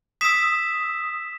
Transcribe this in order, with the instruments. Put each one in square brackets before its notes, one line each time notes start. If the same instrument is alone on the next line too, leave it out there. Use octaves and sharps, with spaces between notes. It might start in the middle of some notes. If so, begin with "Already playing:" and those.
[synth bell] D#6 E6 [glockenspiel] B6 E7